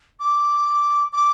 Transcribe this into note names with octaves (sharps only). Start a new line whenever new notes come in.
D6
D6